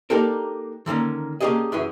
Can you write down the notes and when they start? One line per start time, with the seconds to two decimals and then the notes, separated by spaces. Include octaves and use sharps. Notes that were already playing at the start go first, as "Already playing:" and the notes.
0.10 A#3 D4 D#4 G4 A4 A#4
0.86 D3 D#3 A#3 C#4
1.41 A#3 C#4 D4 G4 G#4 D#5
1.72 F#2 E3 C#4 G#4